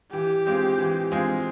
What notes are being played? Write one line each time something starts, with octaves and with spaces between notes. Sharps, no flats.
E3 G4
G#3 C4 F4 G#4
E3
G#3 C4 F4 G#4